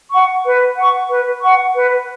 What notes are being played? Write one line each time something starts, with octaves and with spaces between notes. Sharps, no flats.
F#5 C#6
B4
F#5 C#6
B4
F#5 C#6
B4